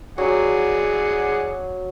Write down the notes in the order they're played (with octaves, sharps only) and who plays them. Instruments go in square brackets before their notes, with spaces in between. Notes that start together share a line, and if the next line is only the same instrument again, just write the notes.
[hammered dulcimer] F#3 [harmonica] G#4 D5 F#5